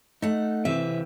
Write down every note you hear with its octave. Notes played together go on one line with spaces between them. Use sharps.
A3 D#4 F#5
C3 E3 C4 E5